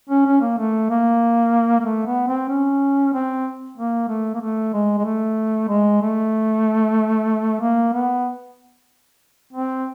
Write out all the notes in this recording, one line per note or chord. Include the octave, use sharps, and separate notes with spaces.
C#4
C#4
A#3
A3
A#3
A#3
A3
B3
C4
C#4
C4
A#3
A3
A#3
A3
G#3
G#3
A3
G#3
A3
A#3
B3
C4